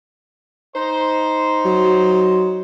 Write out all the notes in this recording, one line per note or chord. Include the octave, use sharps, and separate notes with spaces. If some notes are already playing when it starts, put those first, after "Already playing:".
D#4 C5
F#3